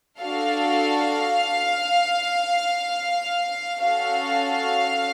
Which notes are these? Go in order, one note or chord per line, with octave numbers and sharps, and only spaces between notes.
D4 F#4 A4 F5
C#4 F#4 A4 F5